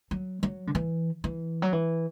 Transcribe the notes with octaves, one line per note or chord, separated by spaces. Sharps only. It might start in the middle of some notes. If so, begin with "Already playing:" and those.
F#3
F#3
D3
E3
E3
F#3
E3